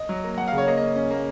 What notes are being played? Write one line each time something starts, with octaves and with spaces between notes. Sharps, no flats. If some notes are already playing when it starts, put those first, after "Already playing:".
Already playing: D#5
F#3
A#3
F#3 F#5
F5
C#3
C#5
A#3 D#5
D#5
C#4
C#4
A#3